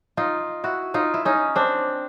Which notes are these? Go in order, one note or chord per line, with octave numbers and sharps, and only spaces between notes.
D#4 F4
E4 F#4
D#4 F4
E4
C#4 D#4
C4 D4